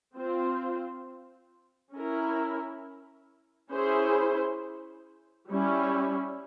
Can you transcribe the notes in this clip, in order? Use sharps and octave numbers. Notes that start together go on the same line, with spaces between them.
C4 F4 C5
C#4 E4 A#4
C#4 E4 G#4 C5
G3 C#4 E4